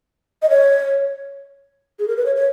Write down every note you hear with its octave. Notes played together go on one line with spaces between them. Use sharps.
D#5
C#5
G#4
A#4
B4
C#5
C#5